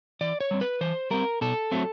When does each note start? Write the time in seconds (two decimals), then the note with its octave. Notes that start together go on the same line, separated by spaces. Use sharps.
0.21 E3 D5
0.41 C#5
0.51 G3 C4
0.61 B4
0.81 E3 C5
1.11 G3 C4 A#4
1.41 B2 A4
1.72 F#3 A3 C4